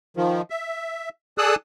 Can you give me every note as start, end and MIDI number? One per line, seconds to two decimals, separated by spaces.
0.17 0.42 51
0.17 0.42 53
0.50 1.09 76
1.38 1.55 68
1.38 1.55 69
1.38 1.55 74
1.38 1.55 87
1.38 1.55 88
1.38 1.55 90